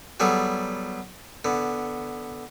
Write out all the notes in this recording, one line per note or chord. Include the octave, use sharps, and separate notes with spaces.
F#3 G3 B3 G#4 A4
D3 B3